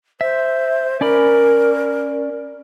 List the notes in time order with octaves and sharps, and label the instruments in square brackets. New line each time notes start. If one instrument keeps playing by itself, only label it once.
[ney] C5 [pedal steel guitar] E5
[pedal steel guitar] C#4 D5 B5 [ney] A#4